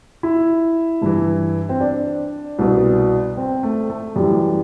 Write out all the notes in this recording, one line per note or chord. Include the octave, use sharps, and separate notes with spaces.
E4
G2 E3
C4
D4
C2 B2
C4
A3
A3
F#2 E3 G3